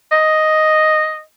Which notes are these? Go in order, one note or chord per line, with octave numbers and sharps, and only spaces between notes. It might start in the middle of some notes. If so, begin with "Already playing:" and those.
D#5